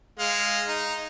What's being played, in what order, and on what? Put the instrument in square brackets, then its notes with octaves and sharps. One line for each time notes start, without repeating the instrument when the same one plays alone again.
[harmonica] G#3 F5
D#4